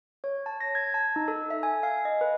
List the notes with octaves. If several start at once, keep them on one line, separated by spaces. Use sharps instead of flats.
C#5
A5
A#6
G#6
A5
D#4
A4
E5
G#5
F5
D#5
B4